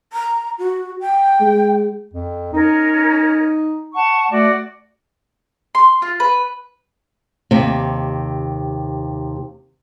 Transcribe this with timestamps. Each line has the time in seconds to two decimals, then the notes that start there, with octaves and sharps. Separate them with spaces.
0.13 A#5
0.59 F#4
1.01 G5
1.41 G#3
2.14 F2
2.53 C#4 D#4 A#4
3.93 F#5 A5 C#6
4.31 A3 F#4 D5
5.75 C6
6.02 F4
6.20 B4
7.51 D#2 C3